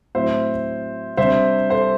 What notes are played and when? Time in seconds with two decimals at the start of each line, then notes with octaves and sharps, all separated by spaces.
0.15 A2 F#3 C4 E4 C5 E5
1.17 C3 G3 D4 C5 E5
1.70 A4 C5